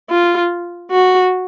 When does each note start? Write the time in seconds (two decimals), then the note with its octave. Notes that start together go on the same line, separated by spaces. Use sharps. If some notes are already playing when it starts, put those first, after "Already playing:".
0.10 F4
0.91 F#4